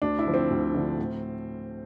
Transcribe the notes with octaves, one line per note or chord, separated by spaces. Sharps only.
D2 D4
E4
D3 F3
C4
D2
D3 F3
A2